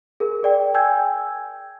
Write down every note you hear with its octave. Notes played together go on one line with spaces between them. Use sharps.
G#4 A#4
G#4 D5 G5
G5 G#5 E6 G6 G#6